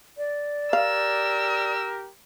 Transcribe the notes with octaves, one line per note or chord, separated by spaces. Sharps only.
D5
G4 A#4 F5 E6